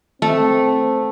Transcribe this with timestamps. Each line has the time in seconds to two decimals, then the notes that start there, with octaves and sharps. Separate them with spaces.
0.22 A3 C4